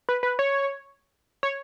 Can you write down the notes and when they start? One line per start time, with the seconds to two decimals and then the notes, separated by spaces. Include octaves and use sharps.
0.09 B4
0.23 B4
0.39 C#5
1.43 C#5